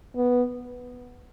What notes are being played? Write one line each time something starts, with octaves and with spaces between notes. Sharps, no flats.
B3